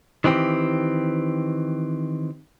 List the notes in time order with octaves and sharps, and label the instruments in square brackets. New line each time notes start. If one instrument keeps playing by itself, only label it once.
[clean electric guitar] D#3 E3 C4 G4